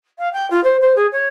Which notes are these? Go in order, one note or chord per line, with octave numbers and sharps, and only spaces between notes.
F5
G5
F4
C5
C5
G#4
C#5